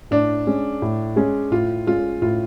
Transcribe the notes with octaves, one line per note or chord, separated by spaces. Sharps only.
A2 D4
G#3 C#4
A2
G#3 C#4
A2 F4
G#3 C#4 F4
A2 F4